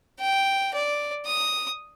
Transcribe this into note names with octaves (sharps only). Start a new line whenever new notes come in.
G5
D5
D#6